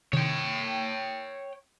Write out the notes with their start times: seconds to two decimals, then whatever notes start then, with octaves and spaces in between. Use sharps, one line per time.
0.13 C3 D#3 C#5 G5